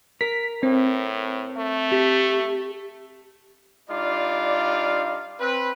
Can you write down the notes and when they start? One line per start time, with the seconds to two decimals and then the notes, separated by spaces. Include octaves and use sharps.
0.21 A#4 B6
0.63 A2 C4
1.57 A3
1.92 G4
3.89 G3 D4 D#4 F4 D5 F5
5.40 C4 B4